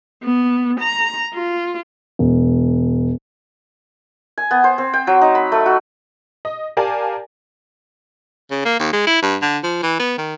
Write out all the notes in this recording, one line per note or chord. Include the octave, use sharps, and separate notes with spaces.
B3
A#5
F4
E1
G#5
B3
C5
C4
G5
F#3
D#4
B5
A3
F#4
D#5
G4 A#4 D5 F5 G#5 A5
C#3
A#3
D#2
G#3
E4
G2
D3
F3
E3
B3
D#3